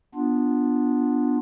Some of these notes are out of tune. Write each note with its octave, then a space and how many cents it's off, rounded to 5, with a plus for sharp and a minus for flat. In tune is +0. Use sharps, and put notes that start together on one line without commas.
B3 -5 D4 +0 F4 -5